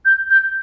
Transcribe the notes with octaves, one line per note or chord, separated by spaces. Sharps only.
G6
G6